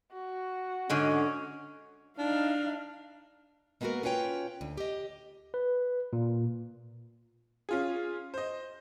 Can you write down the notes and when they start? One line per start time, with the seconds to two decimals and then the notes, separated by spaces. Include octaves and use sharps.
0.13 F#4
0.90 G#2 D3 C#4 D#5
2.18 D4 D#4 F5
3.81 G#3 A#3 B3 F4 F#4 A#4
4.03 C#4 F4 B4 C#5 G5
4.61 D2
4.77 G4 D#5
5.54 B4
6.13 A#2
7.69 C#4 F4 G#4
8.34 C5 D#5